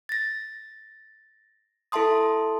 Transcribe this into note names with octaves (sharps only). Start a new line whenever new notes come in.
A6 A#6
E4 A4 E5 A5 C6 D#6